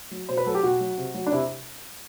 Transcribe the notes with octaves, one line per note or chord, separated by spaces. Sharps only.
F#3
B2 C5
B4
F#3 A4
G4
B2 F#4
F#3
C3
F#3
D4
C3 E4